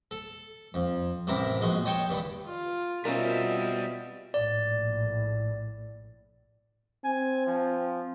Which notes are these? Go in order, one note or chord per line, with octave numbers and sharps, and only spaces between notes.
A4
F2
A1 C3 E4 A#4 A#5
A#1 B2 G#3
C#5 D#5 G5 A5 C#6
G2 D#3 B5
F4
B2 G3 C4 C#4 F4 A#4 D#5 E5
A#1 A2 D5
C4 G#5
F3